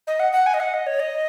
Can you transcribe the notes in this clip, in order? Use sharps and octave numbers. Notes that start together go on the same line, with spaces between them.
D#5
F#5
F#5
G#5
D#5
F#5
D#5
C#5
D#5